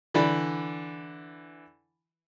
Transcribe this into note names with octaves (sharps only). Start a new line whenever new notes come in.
D3 E3 D5 B5